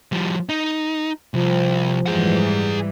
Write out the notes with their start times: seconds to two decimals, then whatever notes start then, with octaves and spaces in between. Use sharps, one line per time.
0.12 F3 G3
0.49 D#4
1.34 C2 F3
2.06 G#2 E3 G3 G#4 F#5